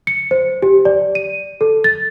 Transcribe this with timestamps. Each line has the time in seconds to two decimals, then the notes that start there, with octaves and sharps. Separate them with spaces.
0.07 C#7
0.31 C5
0.62 G4
0.85 D5
1.15 D#7
1.61 A4
1.84 A6